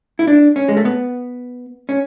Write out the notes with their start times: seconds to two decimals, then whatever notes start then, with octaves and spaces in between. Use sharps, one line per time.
0.19 E4
0.27 D4
0.56 C#4
0.68 G#3
0.77 A3
0.85 B3
1.89 C#4